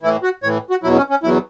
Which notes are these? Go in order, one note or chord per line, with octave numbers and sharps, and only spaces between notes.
A2 E3 E4
F#4
A2 E3 C#5
F#4
E2 B2 F#3 E4
C#4
C#4
E2 B2 F#3 E4